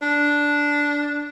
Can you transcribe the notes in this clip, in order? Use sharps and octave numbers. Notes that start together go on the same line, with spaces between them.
D4